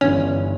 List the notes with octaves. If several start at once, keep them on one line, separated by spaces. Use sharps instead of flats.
G1 G2 E3 C#4 C#5